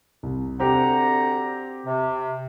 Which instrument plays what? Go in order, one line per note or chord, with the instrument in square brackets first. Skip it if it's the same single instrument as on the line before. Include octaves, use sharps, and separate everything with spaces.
[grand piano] C2
[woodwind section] D2 F#5 A#5 [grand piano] C4 G4
[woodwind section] C3